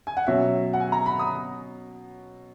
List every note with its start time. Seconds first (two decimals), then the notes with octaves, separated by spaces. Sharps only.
0.07 G#5
0.17 F#5
0.27 B2 F#3 C#4 E5
0.73 F#5
0.80 G#5
0.92 A#5
1.06 B5
1.19 D#6